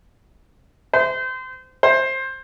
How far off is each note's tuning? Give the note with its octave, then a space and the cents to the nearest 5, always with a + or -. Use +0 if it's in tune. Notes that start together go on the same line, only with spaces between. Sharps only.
C5 -30
C5 +15